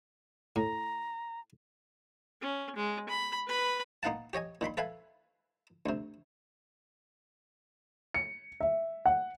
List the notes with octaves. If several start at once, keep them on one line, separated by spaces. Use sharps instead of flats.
A2 A#5
C#4
G#3
B5
B4 B5
A#3 B3 D#4 F5 F#5 A5
G4 C#5 D#5 G#5
A#2 D#3 B5 C6
A4 B4 E5 F5 G#5
D2 C3
C#7
E5
F#5